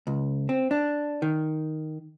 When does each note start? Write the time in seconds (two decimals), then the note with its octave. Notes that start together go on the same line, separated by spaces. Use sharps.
0.07 C#2
0.49 C4
0.71 D4
1.22 D#3